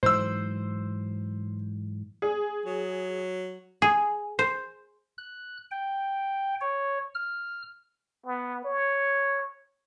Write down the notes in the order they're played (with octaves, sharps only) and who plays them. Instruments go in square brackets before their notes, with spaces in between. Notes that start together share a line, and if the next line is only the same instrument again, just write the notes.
[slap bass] G#2 E3 F#3 [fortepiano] C5 E6
[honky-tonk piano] G#4
[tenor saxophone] F#3
[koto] G#4
C5
[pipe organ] F#6
G5
C#5
F6
[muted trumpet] B3
C#5